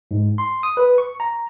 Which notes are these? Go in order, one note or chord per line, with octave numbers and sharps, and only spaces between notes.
G#2
C6
D#6
B4
C#6
A#5